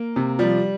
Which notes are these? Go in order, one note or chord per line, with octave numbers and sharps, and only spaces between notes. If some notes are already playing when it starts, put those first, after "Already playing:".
Already playing: A#3
C3
F3 G3